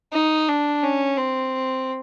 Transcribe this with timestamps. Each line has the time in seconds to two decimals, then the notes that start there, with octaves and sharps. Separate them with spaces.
0.13 D#4
0.48 D4
0.83 C#4
1.17 C4